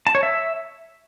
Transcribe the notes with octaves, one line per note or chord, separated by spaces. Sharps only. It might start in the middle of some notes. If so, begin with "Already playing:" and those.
A5
C#5
E5